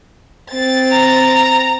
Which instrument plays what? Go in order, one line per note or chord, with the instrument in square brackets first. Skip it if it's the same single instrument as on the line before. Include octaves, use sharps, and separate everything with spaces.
[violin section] C4 A6
[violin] A#5